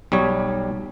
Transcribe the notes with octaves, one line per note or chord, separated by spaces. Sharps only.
B1 G3 C#5